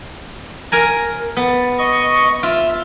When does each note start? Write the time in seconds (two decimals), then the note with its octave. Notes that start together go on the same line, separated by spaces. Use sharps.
0.72 A#4 G#5 A#5
1.37 B3 A6
1.79 D#5 C#6
2.43 F4 E5